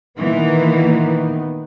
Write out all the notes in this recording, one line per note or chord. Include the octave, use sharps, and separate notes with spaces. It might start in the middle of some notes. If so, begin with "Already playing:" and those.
A#2 D#3 E3 A#3 B3